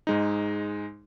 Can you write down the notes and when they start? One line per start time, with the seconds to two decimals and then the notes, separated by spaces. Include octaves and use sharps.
0.07 G#2 G#3 D#4